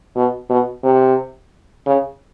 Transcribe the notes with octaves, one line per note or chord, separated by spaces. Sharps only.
B2
B2
C3
C#3